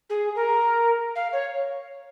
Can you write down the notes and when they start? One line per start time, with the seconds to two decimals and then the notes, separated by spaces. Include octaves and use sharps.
0.09 G#4
0.35 A#4
1.15 F5
1.32 C#5